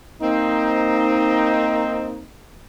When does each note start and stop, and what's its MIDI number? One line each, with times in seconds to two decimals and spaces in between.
0.21 2.23 58
0.21 2.23 60
0.21 2.23 63